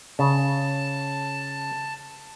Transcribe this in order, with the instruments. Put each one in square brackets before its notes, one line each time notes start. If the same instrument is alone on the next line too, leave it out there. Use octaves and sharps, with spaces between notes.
[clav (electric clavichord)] C#3 [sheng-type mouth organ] A5